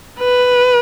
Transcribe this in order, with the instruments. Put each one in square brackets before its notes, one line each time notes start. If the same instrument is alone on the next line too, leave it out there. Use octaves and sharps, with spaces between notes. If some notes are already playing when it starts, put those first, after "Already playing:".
[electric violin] B4